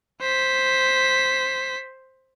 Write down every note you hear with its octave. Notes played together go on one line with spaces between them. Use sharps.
C5 B6